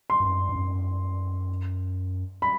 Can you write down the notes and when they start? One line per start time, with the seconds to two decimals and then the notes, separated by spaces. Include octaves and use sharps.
0.10 C6
0.20 G2
0.25 F#2
0.49 G2
0.56 F#2
2.42 B5